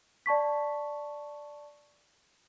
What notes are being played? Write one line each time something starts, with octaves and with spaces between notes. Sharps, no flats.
D5 A5 C#6 B6